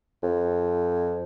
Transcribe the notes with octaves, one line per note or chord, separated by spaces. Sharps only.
F2